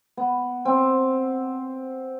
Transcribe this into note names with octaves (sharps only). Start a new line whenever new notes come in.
B3
C4